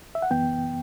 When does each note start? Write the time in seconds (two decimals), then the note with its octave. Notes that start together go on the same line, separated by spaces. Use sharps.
0.15 E5
0.22 F#5
0.30 F#2 E3 B3 G5